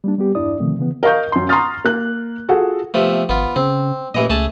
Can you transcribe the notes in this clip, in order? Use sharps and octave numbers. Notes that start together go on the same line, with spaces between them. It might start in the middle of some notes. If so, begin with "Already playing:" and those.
G3 A#3 D4
G3 B3 G4
E2 G2 D4 E4 D5 D#6
B2 D3 D#3 F3 A3 C4
C#3 E3 B3
A#4 D#5 F5 C#6 G6
F#2 C6
A#5 C6 C#6 D#6 F6 A6
A#3 F#6
F4 F#4 G#4 A4 F#5
C3 F3 A3 B3
G#1 B3 F4
C#3 C4
A1 A#2 E3 D#5
C#2 A3 G#4 A5